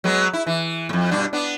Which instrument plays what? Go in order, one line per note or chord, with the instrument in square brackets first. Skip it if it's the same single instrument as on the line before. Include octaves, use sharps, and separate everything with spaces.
[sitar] F#3 G#3 B3
E4
E3
F2 A#2
G2 B2 D4
B3 D4